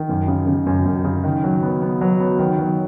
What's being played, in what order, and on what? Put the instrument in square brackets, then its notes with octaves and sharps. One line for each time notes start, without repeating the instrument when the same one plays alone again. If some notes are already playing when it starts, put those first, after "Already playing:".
Already playing: [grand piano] D#3
F#2
C#3
C#3
F#2
F#2
C#3
D#3
F#3
B3
B3
F#3
B3
D#3
F#3